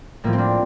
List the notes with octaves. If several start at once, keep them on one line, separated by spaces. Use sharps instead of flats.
A2 F3 A#3
C4
A#3 D4